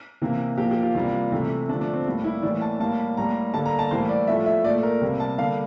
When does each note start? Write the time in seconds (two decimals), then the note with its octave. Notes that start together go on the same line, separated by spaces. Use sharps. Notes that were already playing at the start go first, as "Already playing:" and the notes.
0.22 C3 E3 A#3
0.58 A#2 F3 A#3 G4
0.71 G4
0.83 F4
0.95 C3 E3 G3 A#3 F4
1.32 C3 E3 A3
1.69 D3 F3 A3 D4
1.81 D4
1.94 C4
2.06 A2 G3 A#3
2.24 E4
2.42 A2 E3 A#3 D5
2.61 A5
2.80 A2 G3 A#3 A5
3.17 A2 G3 A#3 A#5
3.54 D3 G3 A#3 A5
3.66 A#5
3.79 A5
3.91 A2 E3 G3 A#3 C5
4.09 D5
4.27 A2 F3 A3 E5
4.46 E5
4.64 A#2 A3 D5
4.83 A#4
5.02 C3 G3 A#3
5.20 A5
5.39 D3 G3 A#3 F5